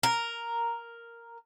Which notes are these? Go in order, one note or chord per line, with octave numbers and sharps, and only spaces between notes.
A#4